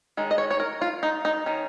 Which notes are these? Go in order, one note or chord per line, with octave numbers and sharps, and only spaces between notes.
D#3 G#3 C#4
D#5
C#5
C#5
A#4
F4
D#4
D#4
D#3 C#4